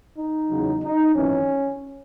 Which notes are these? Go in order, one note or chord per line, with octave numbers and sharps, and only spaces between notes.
D#4
E2 C#3 F#3
D#4
G#1 F#2 E3 C#4